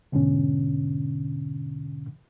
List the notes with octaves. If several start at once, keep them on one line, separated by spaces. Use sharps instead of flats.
E2 G#2 B2 D3 C#4